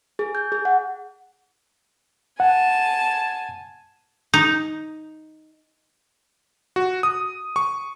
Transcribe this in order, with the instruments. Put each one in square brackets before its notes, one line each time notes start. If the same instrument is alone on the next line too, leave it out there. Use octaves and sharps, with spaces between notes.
[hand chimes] G#4
G6
G#4
F#5
[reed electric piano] F#5 [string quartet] G#5 A5
[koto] D#4
[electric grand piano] F#4
D#6
C#6